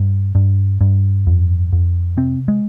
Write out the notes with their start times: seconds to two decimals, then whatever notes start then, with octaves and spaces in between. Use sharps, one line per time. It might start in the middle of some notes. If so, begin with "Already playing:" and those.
Already playing: G2
0.35 G2
0.81 G2
1.27 F2
1.73 F2
2.17 C3 C4
2.48 G#3